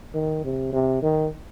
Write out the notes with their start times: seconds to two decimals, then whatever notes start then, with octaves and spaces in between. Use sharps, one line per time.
0.14 D#3
0.44 C3
0.73 C3
1.02 D#3